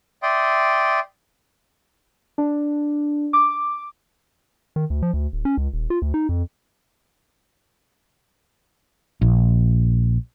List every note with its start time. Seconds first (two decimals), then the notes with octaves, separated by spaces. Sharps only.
0.23 D5 E5 G5 C6 D#6
2.38 D4
3.33 D6
4.76 D#3
4.90 D2
5.02 F3
5.14 D2
5.33 D1
5.45 C#4
5.58 C#2
5.74 D#1
5.90 F4
6.02 D2
6.14 D#4
6.29 F2
9.21 A#1